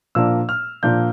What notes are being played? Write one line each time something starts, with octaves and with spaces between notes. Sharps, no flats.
A#2 F3 A#3 D4 E6
F6
A#2 F3 A#3 D4 G6